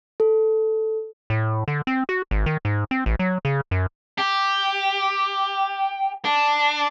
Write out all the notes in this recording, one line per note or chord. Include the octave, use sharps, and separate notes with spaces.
A4
A2
D3
C4
F#4
G#1
D#3
G#2
C4
A1
F#3
C#3
F#2
G4
D4